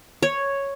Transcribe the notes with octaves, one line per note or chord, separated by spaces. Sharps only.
C#5